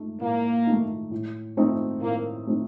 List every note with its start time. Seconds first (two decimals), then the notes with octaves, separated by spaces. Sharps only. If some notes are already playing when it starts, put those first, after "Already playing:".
Already playing: A3 D#4
0.21 A2 A#3
0.67 A3 D#4
1.11 A2
1.57 A3 C4 D#4
2.02 A2 A#3
2.47 A3 C4 D#4